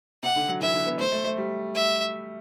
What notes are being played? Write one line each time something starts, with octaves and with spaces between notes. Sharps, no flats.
C3 F#5
D3
F#3
E3 E5
D3
B3
A3 C5
A3
A3
G3
E5